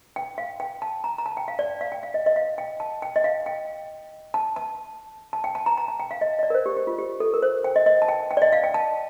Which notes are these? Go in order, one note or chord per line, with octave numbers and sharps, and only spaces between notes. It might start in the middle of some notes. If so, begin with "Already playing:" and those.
G5
F5
G5
A5
A#5
A#5
A5
G5
F5
D5
F5
G5
F5
D#5
D#5
F5
G5
A5
G5
D#5
F5
G5
A5
A5
A5
G5
A5
A#5
A#5
A5
G5
F5
D#5
D#5
D5
A#4
C5
G4
G4
F4
G4
A4
A#4
C5
G5
D#5
D#5
A5
G5
G5
D5
D#5
F5
G5
A5